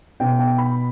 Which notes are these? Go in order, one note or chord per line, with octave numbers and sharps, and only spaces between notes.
B2 G5
G5
B5